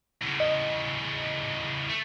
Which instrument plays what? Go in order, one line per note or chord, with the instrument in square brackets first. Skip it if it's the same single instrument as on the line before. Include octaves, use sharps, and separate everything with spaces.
[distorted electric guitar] E2 C#3
[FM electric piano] D#5
[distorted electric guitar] A3